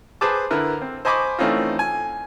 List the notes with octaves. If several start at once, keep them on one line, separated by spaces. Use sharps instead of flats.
G#4 B4 C5 A5 D6
D3 E4 A#4 B4
C4
C5 D#5 G#5 B5 C#6 D6
E3 A3 C4 C#4 D#4 F4
G#5